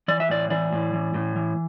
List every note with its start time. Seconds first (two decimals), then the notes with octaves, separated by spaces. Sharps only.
0.08 E3 D5
0.20 E5
0.29 A2 D5
0.50 E3 D5
0.73 A2
0.93 E3
1.14 A2
1.36 E3